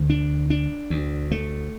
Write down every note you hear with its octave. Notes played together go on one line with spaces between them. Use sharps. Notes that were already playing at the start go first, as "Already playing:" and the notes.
Already playing: D2
D4
D4
D2
A3